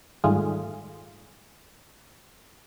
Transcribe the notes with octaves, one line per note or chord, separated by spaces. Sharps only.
G#2 D#3 G3 A3 F4 G#4